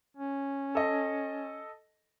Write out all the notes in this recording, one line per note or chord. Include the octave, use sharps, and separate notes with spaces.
C#4
A4 D#5